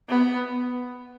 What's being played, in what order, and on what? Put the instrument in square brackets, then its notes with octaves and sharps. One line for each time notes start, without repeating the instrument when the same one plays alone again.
[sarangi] B3